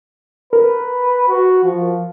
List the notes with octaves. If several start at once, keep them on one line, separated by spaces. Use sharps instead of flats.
A#4 B4
F#4
F3